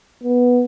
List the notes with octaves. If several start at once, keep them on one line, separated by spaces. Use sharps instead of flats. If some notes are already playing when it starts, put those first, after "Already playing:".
B3